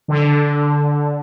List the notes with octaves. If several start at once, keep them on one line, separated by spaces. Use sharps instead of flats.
D3